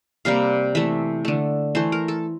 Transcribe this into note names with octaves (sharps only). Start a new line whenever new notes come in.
C3 G3 A#3 F5
E3 A3 E5
D3 A3
E3 A3 C5
A#4
A4